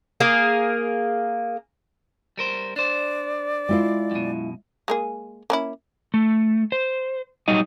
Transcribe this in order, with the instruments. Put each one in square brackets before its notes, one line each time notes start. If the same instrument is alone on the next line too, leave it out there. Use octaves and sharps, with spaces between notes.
[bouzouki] A#3 G#4 A#4
[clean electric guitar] G3 A#4 C5
[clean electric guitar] D4 C5 [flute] D5
[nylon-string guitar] G#3 E4 F4
[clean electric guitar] F#2 B2
[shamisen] G#3 A#3 G#4
A#3 C#4 E4
[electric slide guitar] A3
C5
F#3 G3 D#4 D#5